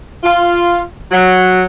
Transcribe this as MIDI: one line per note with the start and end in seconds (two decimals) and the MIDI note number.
0.24 0.81 65
1.12 1.63 54